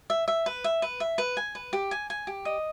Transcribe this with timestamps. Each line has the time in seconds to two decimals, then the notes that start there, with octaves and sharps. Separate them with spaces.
0.10 E5
0.28 E5
0.46 B4
0.64 E5
0.82 B4
1.00 E5
1.18 B4
1.37 G#5
1.55 B4
1.73 G4
1.91 G#5
2.10 G#5
2.27 G4
2.45 D#5